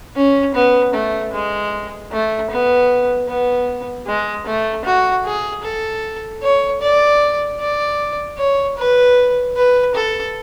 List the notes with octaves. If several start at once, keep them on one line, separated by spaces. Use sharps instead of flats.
C#4
B3
A3
G#3
A3
B3
B3
G#3
A3
F#4
G#4
A4
C#5
D5
D5
C#5
B4
B4
A4